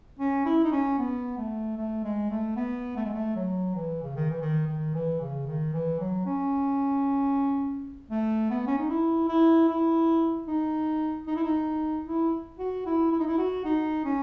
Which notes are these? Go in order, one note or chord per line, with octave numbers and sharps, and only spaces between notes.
C#4
E4
D#4
C#4
B3
A3
A3
G#3
A3
B3
A3
G#3
A3
F#3
E3
C#3
D#3
E3
D#3
D#3
E3
C#3
D#3
E3
F#3
C#4
A3
B3
C#4
D#4
E4
E4
E4
D#4
D#4
E4
D#4
E4
F#4
E4
E4
D#4
E4
F#4
D#4
C#4